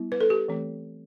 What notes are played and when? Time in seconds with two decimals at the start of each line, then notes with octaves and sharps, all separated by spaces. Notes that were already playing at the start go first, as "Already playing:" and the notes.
Already playing: G3 B3 E4
0.12 B4
0.21 A4
0.30 G4
0.48 E3 A3 C4